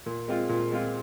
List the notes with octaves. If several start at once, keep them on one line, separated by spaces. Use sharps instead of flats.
A#2
G#3 C4 F4
A#2
G#3 C4 F4